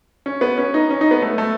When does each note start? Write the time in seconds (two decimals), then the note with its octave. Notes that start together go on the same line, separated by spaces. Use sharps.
0.26 C#4
0.41 B3
0.58 C#4
0.74 D#4
0.90 C#4
1.01 D#4
1.11 B3
1.22 A3
1.38 A3